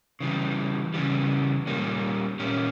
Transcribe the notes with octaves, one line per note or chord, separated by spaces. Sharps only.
C#3 E3 G3
C#3 E3 G3
A#2 G3 A#3 C#4
A#2 G3 A#3 C#4